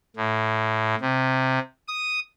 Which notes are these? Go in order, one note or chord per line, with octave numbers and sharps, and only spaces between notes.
A2
C3
D#6